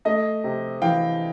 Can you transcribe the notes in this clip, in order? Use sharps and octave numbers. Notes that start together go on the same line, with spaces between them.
A3 D#5
C3
E3 F5 G5